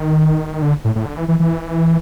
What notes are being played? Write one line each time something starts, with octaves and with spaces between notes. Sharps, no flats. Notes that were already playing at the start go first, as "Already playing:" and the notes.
Already playing: D#3
D3
A2
A2
D3
E3
E3
E3